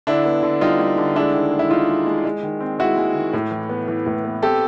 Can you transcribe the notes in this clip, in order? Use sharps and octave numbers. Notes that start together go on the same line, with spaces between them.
D3 D4 E4
B3
D3
G3 D#4 F4
G3
D3
G#3 D4 E4
D#3
G#3
E4
D#3 D#4 F4
G#3
G#3
G#3
D#3
C4
G#3 E4 F#4
G#3
D#3
A2
E3
B3
E3
A2
B3
C4 G4 A4